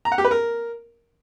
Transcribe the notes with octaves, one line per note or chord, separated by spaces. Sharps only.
A#5
F#5
G4
B4
A#4